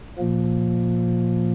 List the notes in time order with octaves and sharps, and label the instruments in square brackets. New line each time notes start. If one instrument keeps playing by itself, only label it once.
[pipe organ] A#2 F3 A#3